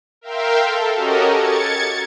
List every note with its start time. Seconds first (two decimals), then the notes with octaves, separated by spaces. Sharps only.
0.21 A#4 E5 F5 G5 C6
0.60 A4
0.95 C#4 F#4 G4 A4 A#4 D#5
1.30 G#6 A6 C#7